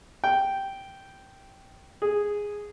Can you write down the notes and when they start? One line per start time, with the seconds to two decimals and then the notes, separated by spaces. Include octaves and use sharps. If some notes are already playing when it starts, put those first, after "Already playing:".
0.24 G5
2.02 G#4